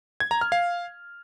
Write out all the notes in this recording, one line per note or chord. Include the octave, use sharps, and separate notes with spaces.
G#6
A#5
F6
F5